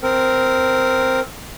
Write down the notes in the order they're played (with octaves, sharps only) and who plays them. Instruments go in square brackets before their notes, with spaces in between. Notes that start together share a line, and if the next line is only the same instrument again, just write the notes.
[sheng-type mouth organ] C4 A#4